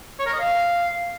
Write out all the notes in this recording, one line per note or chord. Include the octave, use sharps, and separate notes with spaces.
C#5
A#4
D#5
F5